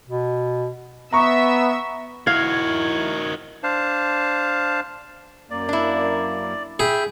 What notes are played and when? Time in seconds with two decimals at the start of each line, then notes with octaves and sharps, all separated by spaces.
0.08 B2
1.13 B3 E5 A#5 C#6 E6
2.27 D#3 E4 F#4 F5 G#6
3.63 D4 C5 F5 A5
5.50 F#2 A#3 D5
5.69 D4 E4
6.80 G#4 E5 G5 B5